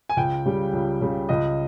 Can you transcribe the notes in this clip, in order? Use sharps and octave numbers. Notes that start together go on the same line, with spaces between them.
G#5
C#2 G5
C#3 G3
C#2
C#3 G3
C#2 D#5